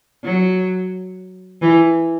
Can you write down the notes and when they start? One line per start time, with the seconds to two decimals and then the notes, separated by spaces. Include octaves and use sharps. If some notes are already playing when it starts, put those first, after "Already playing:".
0.24 F#3
1.62 E3